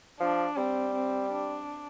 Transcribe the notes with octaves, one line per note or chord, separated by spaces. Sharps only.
F3 D4
G3 C4
C4
D4